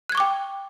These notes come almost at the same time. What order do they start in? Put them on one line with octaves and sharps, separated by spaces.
F#6 G#6 C#6 D6 G5